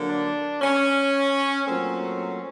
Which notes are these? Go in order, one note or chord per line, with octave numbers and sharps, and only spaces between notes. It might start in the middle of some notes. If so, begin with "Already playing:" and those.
Already playing: D3 F#3 A#3
D4
C#4
A#2 F#3 A3 C4 C#4